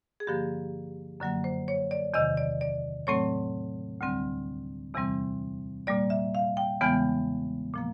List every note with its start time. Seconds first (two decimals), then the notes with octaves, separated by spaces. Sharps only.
0.20 G#4
0.27 G2 D3 F3 A#3 G4
1.20 F#2 D3 F#3 A#3
1.44 C5
1.68 C#5
1.91 D5
2.14 E2 C3 D#3 D#5
2.37 D5
2.61 D5
3.07 A2 F#3 A3 C4 C#5
4.01 D2 D3 G3 C4
4.94 E2 C3 E3 G3 C4
5.87 A#2 G3 A#3 D5
6.10 E5
6.35 F5
6.57 G5
6.81 E2 C#3 E3 G#3 B3 G5
7.74 A#2 F3 A#3